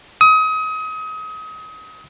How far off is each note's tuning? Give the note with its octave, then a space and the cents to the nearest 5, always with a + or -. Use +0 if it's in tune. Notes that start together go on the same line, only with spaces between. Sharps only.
D#6 +30